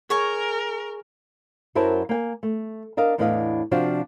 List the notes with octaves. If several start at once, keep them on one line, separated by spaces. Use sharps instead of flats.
G#4 A#4 C#5 G#5 C#6
F#2 F#3 E4 A#4 C5 A5
A#3 G5 G#5
A3
D4 A#4 D#5 F5
E2 A2 D4 B4 D#5 F5
C3 F3 D4 F4 F#4 C5